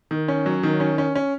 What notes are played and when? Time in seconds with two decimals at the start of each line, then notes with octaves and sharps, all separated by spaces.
0.11 D#3
0.28 C#4
0.46 F#3
0.63 D#3
0.80 C#4
0.98 C#4
1.15 C#4